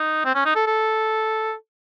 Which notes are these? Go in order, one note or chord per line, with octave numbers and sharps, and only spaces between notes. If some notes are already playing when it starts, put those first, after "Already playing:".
Already playing: D#4
C4
C#4
D#4
A4
A4